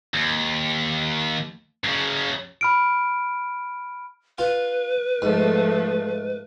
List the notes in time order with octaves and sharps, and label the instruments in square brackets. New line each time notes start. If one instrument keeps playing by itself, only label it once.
[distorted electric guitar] D#2
F#2 C#3
[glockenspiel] B5 F6 D7
[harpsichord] F4 [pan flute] B4
[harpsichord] G#2 [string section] F3 A3